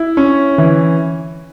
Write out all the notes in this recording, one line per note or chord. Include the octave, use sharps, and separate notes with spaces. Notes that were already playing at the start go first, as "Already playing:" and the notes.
Already playing: E4
C#4
E3